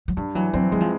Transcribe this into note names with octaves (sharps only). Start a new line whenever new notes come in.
F#3
G2 G3
E3 F#3
F#3 C4
F#3 G#3
F3